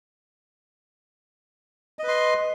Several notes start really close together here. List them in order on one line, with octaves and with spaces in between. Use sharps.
D#5 B4 C6